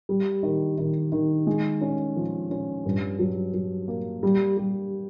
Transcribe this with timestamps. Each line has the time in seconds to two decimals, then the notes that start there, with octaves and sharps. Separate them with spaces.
0.09 G3
0.43 D#3
0.78 D#3
1.12 D#3
1.47 G#3
1.81 C#4
2.16 F3
2.51 C#4
2.85 G2
3.19 F#3
3.54 F#3
3.88 A#3
4.23 G3
4.57 G3